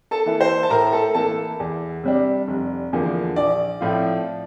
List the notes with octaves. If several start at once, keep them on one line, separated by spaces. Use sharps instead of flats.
A4 A5
E3 A#3 E4
C5 C6
A5
A2 A#4 A#5
A4 A5
E3 A#3 E4 A4 A5
E2
C3 G3 D4
F1
E2 D3 F3 A#3
A#1 D5
A2 F3 C4 F4